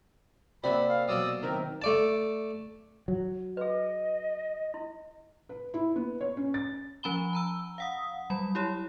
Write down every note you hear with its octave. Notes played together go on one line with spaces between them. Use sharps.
C3 A#3 C5 D5 E5 F#5 B5
F5
B2 F#3 D5 C6 D#6 E6
D#3 C4 A#4 E5
A3 D5 A5
F#3
G#4 B4 D#5
E4
B4
E4
B3
C#5
C#4
A6
F3 C#4 A#5 B5 G7
A5 A#5 E6
F5 F#5 D#6
F#3 G3 B5
E4 G4 C#5